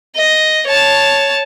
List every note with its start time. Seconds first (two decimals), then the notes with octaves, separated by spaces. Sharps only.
0.16 D#5
0.68 C#5 A5